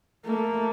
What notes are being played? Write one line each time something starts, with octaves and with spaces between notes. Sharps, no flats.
A3 A#3